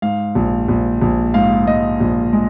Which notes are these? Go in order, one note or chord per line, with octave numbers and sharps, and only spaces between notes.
G#2 F5
A#1
A#1
A#1
G#2 F5
G#2 D#5
A#1
G#3